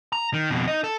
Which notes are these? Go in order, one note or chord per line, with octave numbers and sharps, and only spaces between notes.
A#5
D#3
F2 B2
D#4 D#5
A4